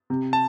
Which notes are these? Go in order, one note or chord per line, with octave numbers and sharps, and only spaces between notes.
C3
A5